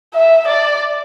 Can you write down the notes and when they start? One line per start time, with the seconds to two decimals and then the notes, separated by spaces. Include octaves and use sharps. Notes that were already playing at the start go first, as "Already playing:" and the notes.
0.14 E5
0.47 D5